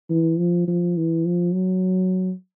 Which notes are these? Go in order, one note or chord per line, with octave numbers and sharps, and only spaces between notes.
E3
F3
F3
E3
F3
F#3